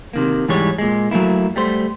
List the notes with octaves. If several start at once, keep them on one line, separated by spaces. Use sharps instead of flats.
C3 D#3 A#3
G#2 E3 G3 G#3 G4 C#5
A#2 G#3
F#3 A3 A#3 E4
G3 A3 C5